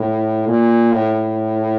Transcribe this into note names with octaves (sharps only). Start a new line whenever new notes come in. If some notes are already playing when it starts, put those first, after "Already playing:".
Already playing: A2
A#2
A2